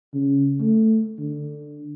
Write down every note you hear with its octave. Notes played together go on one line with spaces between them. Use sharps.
C#3
A3
D3